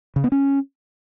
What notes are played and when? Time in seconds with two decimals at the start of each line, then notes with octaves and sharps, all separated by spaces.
0.16 C#3
0.24 B3
0.32 C#4